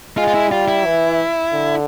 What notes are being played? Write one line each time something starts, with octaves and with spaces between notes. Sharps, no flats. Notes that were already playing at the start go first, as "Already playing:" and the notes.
G#3 F4
F4
E4
G3 F4
E4
E3
D3